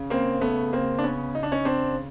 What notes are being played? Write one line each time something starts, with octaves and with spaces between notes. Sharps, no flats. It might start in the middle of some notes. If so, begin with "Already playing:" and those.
Already playing: C#3
A#3 C4
A3 B3
A#3 C4
D4
B3 C#4
D#4
D4
C#4 D#4
C4 D4